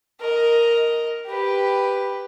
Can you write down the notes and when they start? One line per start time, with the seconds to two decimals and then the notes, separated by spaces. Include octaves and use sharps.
0.20 A#4 D#5
1.27 G4 B4